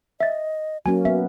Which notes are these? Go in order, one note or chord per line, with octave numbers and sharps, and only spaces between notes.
D#5 E5 A6
F#3 A#3 C#4 F#4 G#5
B3 E5